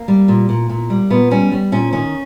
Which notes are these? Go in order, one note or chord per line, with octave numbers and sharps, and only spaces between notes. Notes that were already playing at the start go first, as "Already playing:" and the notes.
Already playing: A#3
G3
A#2
A#2
A#2
G3
A#2 B3
G3 C#4
G3
A#2 C#4
D#3 C#4